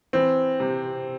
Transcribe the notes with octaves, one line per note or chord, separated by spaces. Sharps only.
E3 C4
C3